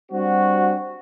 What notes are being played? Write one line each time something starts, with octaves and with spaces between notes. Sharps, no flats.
G3 C4 D4 F#4